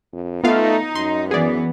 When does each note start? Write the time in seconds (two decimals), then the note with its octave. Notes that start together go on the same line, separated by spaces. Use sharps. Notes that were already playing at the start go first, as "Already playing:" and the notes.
0.13 F2
0.44 A3 B3 D#4 F4 F5
0.95 F#2 C6
1.31 E3 B3 G#4 D5